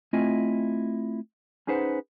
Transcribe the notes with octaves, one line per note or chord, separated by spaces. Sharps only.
A3 C4 E4 F4 D#5 G#5
C#4 D#4 G#4 B4 C5 F#5